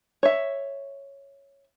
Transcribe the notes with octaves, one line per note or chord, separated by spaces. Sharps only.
C#5 E5